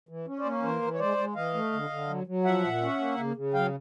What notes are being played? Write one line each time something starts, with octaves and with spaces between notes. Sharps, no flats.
E3
C#4
C5 D5
A#3
E3 A#4 C5
E3
C#5
G#3 C5 D5
G#3
E3 D#5 F5
A3
D3
D3
F#3
F#3
F3 E5 F#5
A#2
C#4
A#3
C#3
C#3
F#3 F5 G5